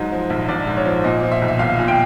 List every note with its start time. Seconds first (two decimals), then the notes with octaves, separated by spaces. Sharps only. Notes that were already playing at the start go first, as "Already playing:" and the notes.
Already playing: G#2 F#3 D#5
0.12 F3
0.30 A#1
0.48 A#1 D5
0.67 G#2
0.77 C#5
0.85 F3
1.04 A#2 D#5
1.23 F3
1.32 E5
1.42 B1
1.48 E5
1.59 B1 F5
1.79 A#2
1.88 G5